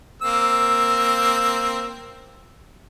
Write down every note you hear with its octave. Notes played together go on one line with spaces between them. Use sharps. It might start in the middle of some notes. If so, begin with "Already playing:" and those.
A#3 C4 E6